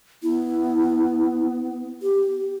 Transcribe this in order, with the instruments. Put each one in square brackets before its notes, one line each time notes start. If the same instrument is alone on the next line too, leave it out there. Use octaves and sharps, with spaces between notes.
[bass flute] B3 [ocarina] E4
[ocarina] G4